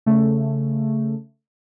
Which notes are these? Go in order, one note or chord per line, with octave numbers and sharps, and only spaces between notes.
C#3 A3